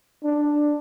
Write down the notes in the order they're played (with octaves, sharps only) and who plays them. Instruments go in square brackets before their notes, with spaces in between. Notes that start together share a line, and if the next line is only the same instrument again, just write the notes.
[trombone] D4